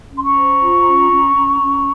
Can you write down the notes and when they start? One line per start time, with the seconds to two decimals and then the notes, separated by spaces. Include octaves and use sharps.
0.09 C#4
0.18 C6
0.22 A#5 C#6
0.34 C5
0.60 F4
0.85 C#4
1.10 C#4
1.35 C#4
1.61 C#4